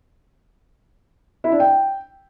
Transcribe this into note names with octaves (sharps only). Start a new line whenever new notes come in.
E4
D4
G5